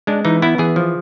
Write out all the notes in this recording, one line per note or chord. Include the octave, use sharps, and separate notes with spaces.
G#3 D4
E3 D#4
B3 E4
E3 G#4
F3